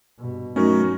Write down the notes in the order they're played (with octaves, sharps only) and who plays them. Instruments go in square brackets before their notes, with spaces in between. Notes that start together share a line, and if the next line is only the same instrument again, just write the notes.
[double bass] G2 B2
[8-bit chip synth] F#3 A3 [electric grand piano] C#4 D#4 A#4 [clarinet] F#4